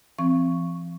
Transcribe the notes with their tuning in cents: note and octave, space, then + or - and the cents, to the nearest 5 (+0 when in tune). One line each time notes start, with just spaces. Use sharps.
F3 -40 C4 +0 C#6 +0